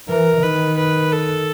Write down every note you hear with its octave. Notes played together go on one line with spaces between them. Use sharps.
E3 A#4
D#3 B4
B4
A4